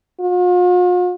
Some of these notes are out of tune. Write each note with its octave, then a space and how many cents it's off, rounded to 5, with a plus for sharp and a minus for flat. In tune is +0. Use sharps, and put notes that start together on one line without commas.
F4 +45